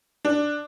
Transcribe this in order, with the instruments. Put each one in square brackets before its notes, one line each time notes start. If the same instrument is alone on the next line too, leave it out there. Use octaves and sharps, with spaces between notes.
[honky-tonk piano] D4